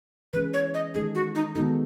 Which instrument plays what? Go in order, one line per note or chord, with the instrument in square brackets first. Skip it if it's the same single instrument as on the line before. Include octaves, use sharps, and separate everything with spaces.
[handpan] E3 G#3 C#4 G#4 [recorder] B4
[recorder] C#5
D#5
[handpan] D#3 G#3 D#4 A4 [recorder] G#4
[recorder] F#4
D#4
[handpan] D#3 G#3 B3 F#4 A4 [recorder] D#4